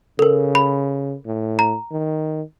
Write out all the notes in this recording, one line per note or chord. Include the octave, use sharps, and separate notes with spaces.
C#3 A4 A#4
B5
A2
A#5
D#3